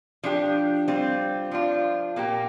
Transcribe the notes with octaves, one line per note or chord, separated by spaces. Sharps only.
F3 D4 G4
G3 C4 F4
F3 D4 F4
A#2 A#3 G4